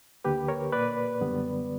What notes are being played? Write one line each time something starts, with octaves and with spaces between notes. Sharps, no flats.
D2 D3 A#3 G4 B4
A#4 C#5
A#2 A#3 B4 D5
F#2 D3 G3 B3